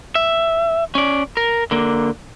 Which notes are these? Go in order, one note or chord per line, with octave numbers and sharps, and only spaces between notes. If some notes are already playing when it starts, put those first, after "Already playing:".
E5
C#4 D5
A#4
D3 A#3